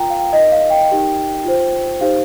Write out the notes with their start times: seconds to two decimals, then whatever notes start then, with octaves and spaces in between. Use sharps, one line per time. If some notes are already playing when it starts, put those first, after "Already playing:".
Already playing: F4 A#4 G5 A#5
0.10 F5
0.19 G5
0.33 D#4 A#4 D#5
0.52 F5
0.70 G5
0.89 D#4 G4 A#4
1.44 F4 C5
2.01 D#4 G4 C5 F5